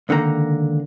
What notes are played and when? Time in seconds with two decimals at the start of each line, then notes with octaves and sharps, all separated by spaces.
0.09 C#2 D3 D#3 A#3 A#5